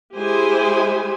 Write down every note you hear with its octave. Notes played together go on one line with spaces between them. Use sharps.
G#3 E4 G4 G#4 C5 G#5